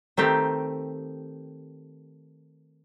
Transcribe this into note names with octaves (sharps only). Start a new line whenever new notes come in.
D#3 A3 C4 G4